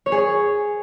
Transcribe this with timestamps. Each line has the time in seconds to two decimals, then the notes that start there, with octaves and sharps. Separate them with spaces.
0.06 C#5
0.12 G#4
0.18 C#5